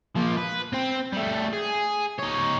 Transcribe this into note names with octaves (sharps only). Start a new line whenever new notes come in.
F3 A#3
B4
C4 C5
G3 A3
G#4
D#4 C#5